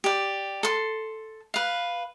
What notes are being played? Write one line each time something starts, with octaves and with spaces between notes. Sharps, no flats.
G4 D5
A4 C6
B4 F5